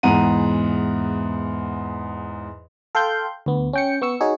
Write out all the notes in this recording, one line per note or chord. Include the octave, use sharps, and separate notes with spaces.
E2 G#2 F#5 A#5 D#7
A4 F5 G5 C6 G6
D2 B3
C#4 G5 C#7
B3 C#6 E6 C#7
D#4 F#4 G#4 C#5